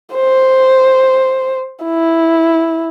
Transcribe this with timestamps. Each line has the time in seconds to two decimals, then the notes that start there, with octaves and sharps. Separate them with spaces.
0.15 C5
1.85 E4